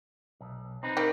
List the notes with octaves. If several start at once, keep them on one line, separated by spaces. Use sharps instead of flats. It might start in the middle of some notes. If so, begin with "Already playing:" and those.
B1
C4 D#4 B4
D#3 G3 G4